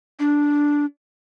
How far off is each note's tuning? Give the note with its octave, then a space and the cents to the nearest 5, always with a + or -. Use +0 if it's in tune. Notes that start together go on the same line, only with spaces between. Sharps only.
D4 -5